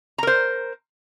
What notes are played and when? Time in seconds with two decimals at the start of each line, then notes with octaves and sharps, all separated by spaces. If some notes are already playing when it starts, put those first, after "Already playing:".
0.18 A#5
0.23 A#4
0.27 C5